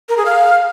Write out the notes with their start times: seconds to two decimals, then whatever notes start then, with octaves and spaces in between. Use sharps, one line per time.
0.09 A#4
0.17 G#4
0.26 F5